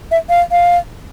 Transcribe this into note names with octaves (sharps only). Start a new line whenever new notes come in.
E5
F5
F5